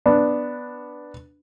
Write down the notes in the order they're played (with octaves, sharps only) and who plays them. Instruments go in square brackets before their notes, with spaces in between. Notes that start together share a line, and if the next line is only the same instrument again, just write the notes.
[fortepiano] B3 D4